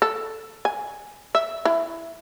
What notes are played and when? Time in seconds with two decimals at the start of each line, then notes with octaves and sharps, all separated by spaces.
0.02 A4
0.65 G#5
1.35 E5
1.65 E4